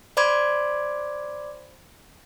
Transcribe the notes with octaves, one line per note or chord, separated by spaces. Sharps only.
C5 D5 B5 C6 D6 G#6